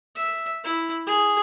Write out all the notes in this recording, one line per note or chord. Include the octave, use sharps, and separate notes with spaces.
E5
E4
G#4